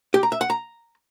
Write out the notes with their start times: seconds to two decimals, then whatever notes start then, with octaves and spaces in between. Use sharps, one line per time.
0.14 G4
0.23 A#5
0.32 E5
0.41 F#5
0.50 A#5